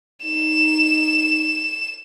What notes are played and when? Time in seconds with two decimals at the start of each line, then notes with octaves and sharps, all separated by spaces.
0.25 D#4 E7